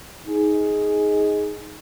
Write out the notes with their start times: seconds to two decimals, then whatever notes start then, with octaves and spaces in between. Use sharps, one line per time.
0.28 D#4 G#4